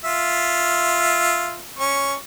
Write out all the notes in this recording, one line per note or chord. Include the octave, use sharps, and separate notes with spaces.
F4 E5
C#4 C#6